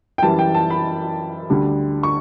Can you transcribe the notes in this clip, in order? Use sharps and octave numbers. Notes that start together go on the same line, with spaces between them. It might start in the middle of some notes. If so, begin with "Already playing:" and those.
G5
F#2 E3 G3 A5
G5
A5
B5
D2 D3 G3
C#6